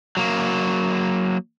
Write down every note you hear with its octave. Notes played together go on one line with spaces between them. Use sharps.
F#3 A#3